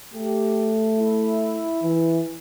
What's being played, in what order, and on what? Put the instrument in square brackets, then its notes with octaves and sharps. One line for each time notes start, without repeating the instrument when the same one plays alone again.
[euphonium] A3 [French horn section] G4
[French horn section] E4
[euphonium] E3